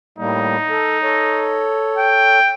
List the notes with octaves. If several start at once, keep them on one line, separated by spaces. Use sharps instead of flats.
A2 G3 A#3 D#4
A4
A4 C#5
G5